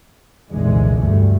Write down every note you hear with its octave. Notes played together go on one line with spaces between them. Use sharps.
F1 C2 A#2 D3 E3 G#3
D2 G2 A3